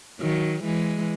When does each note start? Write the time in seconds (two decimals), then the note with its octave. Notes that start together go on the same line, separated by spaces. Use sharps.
0.20 D#3 F#3
0.64 E3 G#3